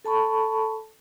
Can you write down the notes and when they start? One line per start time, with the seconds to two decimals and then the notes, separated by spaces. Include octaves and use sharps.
0.05 A4 A5 B5 C#6